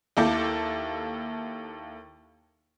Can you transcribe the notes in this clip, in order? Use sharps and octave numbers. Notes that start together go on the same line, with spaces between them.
D#2 A#3 E4 A4 D6 G6